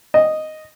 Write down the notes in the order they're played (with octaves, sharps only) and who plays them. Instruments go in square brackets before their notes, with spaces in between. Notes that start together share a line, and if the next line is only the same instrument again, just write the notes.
[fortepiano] D#5